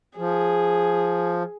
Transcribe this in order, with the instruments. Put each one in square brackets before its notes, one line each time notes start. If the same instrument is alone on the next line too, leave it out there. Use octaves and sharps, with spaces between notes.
[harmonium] F3 [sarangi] G#4